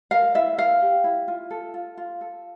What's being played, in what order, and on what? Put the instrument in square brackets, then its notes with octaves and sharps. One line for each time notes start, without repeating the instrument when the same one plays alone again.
[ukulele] A#4 F5
E4 E5
A#4 F5
G4
E4
F4
A4
F4
F4
A4